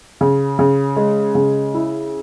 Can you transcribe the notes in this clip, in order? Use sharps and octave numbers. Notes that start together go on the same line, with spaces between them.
C#3
C#3
G#3
C#3
E4